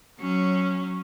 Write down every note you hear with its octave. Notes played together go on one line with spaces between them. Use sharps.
F#3 C#4